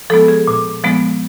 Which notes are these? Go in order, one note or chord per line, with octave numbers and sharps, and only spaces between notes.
F3 G#3 B3 A4
G#4
A#2
F3 G#3 B3